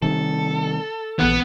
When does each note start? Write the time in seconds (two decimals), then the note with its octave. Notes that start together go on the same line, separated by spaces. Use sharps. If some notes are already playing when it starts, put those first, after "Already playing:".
0.02 C3 D#3 G3 A4
1.19 A#1 E3 B3